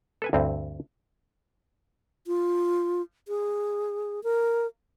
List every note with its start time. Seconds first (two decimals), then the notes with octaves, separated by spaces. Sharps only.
0.22 A4 B4 G#5
0.33 D2 G2 C4
2.27 F4
3.28 G#4
4.24 A#4